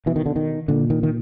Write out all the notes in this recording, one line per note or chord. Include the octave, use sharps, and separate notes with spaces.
B2 E3
D#3
D3
D#3
A#2 D3
D#3
D#3